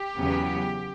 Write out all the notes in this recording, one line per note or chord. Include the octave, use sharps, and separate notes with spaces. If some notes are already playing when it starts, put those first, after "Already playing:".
Already playing: G4
E2 C#3 F#3 B3